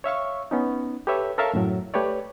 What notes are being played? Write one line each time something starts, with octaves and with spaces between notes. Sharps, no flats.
C#5 E5 F5 C#6
B3 C#4 D#4
G4 A4 B4 C#5 E5
A4 A#4 C#5 E5 F5 A5
F#2 A2 F#3
A3 G4 B4 C#5 D5